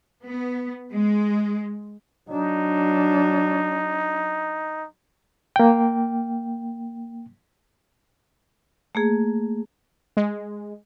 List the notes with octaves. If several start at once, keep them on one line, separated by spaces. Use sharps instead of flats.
B3
G#3
F#3 D4 D#4
A#3 G5
A3 A#3 G#4
G#3